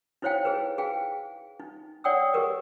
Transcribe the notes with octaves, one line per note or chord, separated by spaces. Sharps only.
D#4 E4 C5 C#5 F5 G5
G#4 B4
G#4 F5 G5
D#4
C#5 D5 F#5 G5 D#6 E6
G4 G#4 A#4 B4 D#5